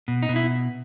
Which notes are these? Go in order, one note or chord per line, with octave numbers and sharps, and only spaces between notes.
B2
D#4
B2
E4